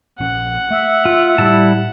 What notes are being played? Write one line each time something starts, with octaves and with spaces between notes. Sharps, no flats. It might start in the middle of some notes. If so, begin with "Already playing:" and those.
A#1 F3 C#4 F#5
A3 E5
F4
A2 G3 E4 A5